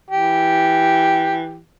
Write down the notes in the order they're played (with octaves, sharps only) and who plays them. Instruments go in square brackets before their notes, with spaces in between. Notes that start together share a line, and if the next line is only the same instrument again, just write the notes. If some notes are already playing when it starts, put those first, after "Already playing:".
[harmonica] E3 G4